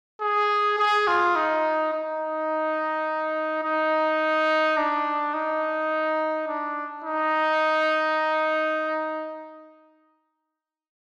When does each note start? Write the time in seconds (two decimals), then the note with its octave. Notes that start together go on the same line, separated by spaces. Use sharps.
0.21 G#4
0.78 G#4
1.08 F4
1.36 D#4
1.93 D#4
3.63 D#4
4.77 D4
5.34 D#4
6.48 D4
7.05 D#4